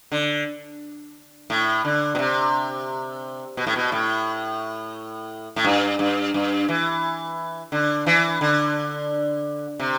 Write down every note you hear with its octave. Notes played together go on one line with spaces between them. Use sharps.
D3
A2
D3
B2
C3
B2
A2
B2
A2
A2
G2
G2
G2
E3
D3
E3
D3
C3